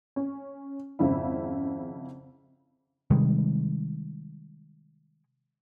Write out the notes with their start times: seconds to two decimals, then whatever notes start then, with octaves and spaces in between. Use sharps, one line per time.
0.16 C#4
0.99 G#1 F2 C#3 E4
3.10 C3 D#3 G3 G#3